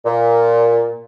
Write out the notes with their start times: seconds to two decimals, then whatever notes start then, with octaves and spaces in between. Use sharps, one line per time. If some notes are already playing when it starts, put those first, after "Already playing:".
0.04 A#2